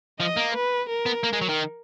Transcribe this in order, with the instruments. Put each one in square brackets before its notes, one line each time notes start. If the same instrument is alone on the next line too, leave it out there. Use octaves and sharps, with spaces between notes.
[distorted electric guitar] F3 [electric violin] D#5
[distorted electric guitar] A#3
[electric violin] B4
A#4
[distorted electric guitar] B3
A#3
G#3
F#3
D#3